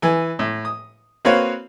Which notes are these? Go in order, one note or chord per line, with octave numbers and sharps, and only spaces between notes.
E3 G#5
A2
D#6
A#3 C4 F#4 B4 C#5 F5